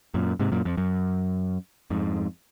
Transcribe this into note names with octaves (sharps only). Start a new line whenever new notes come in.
F#2 A#2
G#2 C3
F#2 A#2
F2
F#2
F2 G#2